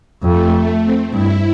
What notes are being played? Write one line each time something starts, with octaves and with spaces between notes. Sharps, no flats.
F2 A3
C4
G2 E4